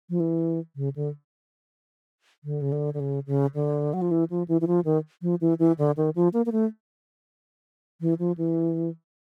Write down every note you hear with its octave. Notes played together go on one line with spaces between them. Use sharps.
F3
E3
C#3
D3
D3
C#3
D3
D3
C#3
C#3
D3
F#3
F3
E3
F3
E3
E3
F3
D#3
F3
E3
E3
D3
D#3
F3
A#3
A#3
A3
E3
F3
E3